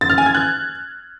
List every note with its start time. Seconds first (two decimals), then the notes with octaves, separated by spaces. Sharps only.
0.01 A6
0.10 F6
0.18 G#5
0.26 G#6
0.35 F#6